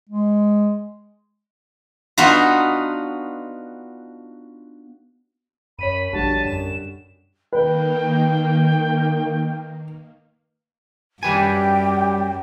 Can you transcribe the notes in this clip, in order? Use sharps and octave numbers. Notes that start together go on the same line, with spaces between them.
G#3
B3 D4 D#4 F4 F#4
F#2 C#5 B5 B6 D#7
A#1 D3 G3 F#4 A5
F#2 E7
D#3 A#3 B4 G5
F#2 G3 G4 B4 G5 G#5